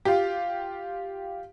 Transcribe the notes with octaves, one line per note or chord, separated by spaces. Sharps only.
F4 G4